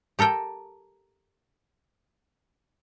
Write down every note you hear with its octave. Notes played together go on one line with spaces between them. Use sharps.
G4 A4 A#4 G5